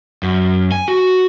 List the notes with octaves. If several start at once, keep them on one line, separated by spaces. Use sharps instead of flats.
F#2
G#5
F#4